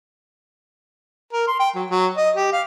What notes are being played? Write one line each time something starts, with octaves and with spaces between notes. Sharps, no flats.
A#4
C6
G5
F#3
F#3
D#5
G4
F5